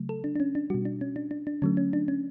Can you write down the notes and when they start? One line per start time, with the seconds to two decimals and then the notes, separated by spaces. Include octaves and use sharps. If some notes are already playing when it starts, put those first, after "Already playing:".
Already playing: C#3 F#3 A3
0.09 A4
0.24 D4
0.36 D4
0.40 C#4
0.55 D4
0.70 B2 G3 F#4
0.85 D4
1.01 C#4
1.16 D4
1.31 D4
1.47 D4
1.62 D3 F#3 A3 C#4
1.77 C#4
1.93 D4
2.08 C#4